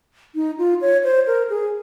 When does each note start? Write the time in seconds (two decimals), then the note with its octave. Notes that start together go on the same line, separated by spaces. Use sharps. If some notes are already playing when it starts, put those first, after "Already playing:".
0.35 D#4
0.58 F4
0.81 C#5
1.04 C5
1.27 A#4
1.50 G#4